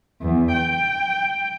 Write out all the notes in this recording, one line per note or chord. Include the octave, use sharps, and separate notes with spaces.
E2
G5